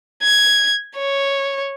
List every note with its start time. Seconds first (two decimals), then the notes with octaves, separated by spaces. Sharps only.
0.23 G#6
0.97 C#5